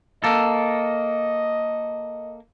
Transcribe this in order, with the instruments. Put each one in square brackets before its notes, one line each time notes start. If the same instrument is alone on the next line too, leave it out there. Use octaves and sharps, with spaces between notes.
[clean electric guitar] A#3 A4 [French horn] D#5